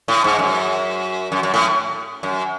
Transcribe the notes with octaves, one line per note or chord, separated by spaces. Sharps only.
A2
G#2
F#2
F#2
F#2
A2
F#2